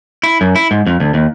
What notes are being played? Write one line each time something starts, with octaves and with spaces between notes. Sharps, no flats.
E4
F#2
E4
G#2
F2
D2
D#2